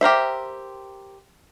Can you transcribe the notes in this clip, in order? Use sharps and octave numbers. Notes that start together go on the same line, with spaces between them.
G4 A#4 C5 E5